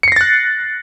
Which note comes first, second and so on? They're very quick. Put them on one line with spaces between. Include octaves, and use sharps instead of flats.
C#7 C7 A#6 A6 F#6